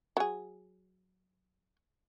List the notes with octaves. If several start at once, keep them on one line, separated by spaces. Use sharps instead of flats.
F#3 G#4